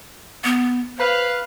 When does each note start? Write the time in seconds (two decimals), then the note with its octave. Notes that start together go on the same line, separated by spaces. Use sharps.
0.44 B3
0.98 B4 C5 F5